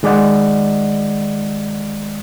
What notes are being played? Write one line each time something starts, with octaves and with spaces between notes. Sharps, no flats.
D#3 G#3 D5 D#5 F#5